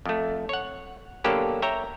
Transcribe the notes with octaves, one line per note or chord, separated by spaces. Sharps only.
F2 A3
C#5 F#5
B2 D3 F#3 A#3 G4 A4
C#5 E5 G5 A#5